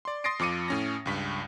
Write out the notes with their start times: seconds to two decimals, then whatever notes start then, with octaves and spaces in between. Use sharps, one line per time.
0.05 D5 C6
0.24 C6 D#6 A6 A#6 C7 D7
0.39 F2 F3 D6 C#7 D#7
0.68 A2 C#4 A#6
1.06 C#2 G2 B6